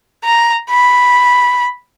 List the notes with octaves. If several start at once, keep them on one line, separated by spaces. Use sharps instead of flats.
A#5
B5